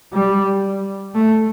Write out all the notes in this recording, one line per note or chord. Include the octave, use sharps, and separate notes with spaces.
G3
A3